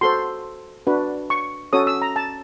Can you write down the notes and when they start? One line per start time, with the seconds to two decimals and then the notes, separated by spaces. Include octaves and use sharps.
0.01 F#4 A4 C5 C6
0.87 D4 F#4 B4
1.30 C#6
1.73 C#4 F#4 A4 C#5 D#6
1.87 E6
2.02 A#5
2.16 A5